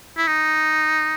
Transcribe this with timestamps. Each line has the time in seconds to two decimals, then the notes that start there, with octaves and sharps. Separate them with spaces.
0.17 E4
0.27 D#4